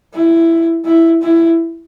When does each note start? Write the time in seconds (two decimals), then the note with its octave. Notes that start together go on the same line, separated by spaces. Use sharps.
0.13 E4
0.85 E4
1.22 E4